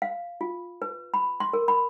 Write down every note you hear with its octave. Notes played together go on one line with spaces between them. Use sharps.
F5
F4
B4
B5
C6
A#4
B5